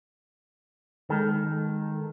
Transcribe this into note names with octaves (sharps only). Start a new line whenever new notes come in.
D#3 G#3 A4